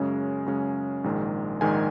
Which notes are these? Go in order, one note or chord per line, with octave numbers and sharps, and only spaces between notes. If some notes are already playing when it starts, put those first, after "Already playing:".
Already playing: F#2 C#3 G#3 C#4
F#2 C#3 G#3 C#4
A#1 G#2 D#3 G#3
A#1 G#2 D#3 G#3 G#5